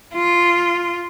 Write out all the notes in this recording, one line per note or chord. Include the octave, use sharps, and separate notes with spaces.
F4